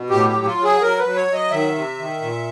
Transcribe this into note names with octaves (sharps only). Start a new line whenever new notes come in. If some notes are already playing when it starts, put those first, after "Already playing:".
Already playing: B2
A2 G4
G4
F#3
F4
F#3
G#4
F#3 A#4
B4
F#3
C#5
F#3 D#5
D#3 E5
C3
D#3
A#2